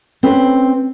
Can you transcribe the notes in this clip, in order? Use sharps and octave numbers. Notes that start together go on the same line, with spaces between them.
C4 C#4 B4